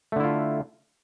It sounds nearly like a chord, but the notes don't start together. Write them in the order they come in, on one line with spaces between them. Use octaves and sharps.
A3 D3 E4 F4